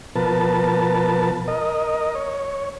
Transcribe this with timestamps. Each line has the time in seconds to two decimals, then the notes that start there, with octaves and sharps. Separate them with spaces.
0.16 B2 F3 A#4 B4 A5
1.48 A#4 D#5
2.15 C#5